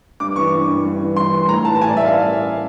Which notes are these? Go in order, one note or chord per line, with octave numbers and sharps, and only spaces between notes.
G2 D6
E3 C#6
G2
G2
G2
E3
E3 C6
E3
A2 A#5
E3 A5
A5
A2 G#5
D5
A2 E5
F5